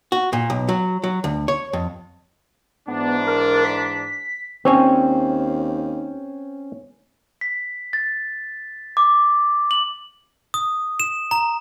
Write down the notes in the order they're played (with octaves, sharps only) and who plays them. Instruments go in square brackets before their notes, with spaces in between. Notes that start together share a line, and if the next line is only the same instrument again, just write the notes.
[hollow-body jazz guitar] F#4
A#2
B1
F#3
F#3
D2
C#5
F2
[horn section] G#2 E3 D4 [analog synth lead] B3
[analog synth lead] A#4
B6
[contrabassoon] D#2 [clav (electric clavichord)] C4 C#5 G#5 [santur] C#4 C5
[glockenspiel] B6
A6
D6
F#7
D#6
E7
A#5